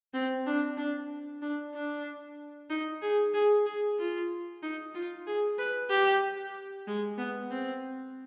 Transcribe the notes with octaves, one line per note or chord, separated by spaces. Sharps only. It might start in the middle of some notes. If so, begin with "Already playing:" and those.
C4
D4
D4
D4
D4
D#4
G#4
G#4
G#4
F4
D#4
F4
G#4
B4
G4
G#3
B3
C4